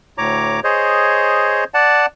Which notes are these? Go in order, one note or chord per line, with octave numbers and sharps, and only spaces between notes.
D2 A2 C#5 A#5 D6
G#4 C5 C#5 D#5
D5 F#5 A5